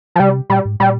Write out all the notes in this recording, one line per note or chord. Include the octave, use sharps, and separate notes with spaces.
F3
C3 G3
A#2 G3
G#2
A#2 G3